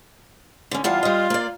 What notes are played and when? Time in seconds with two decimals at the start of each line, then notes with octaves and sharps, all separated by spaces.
0.71 D3 C#4
0.84 E2 G3 F4 A5
1.03 G3 D#5
1.30 A#3 D5